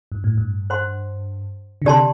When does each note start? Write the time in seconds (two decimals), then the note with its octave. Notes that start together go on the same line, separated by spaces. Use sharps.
0.12 G2
0.24 A2
0.37 G2
0.70 C5 F#5 C6
1.82 D3
1.85 C3 G4 D5 A5 C6